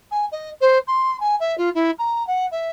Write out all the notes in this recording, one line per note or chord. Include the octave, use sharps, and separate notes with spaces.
G#5
D#5
C5
C6
G#5
E5
F4
E4
A#5
F#5
E5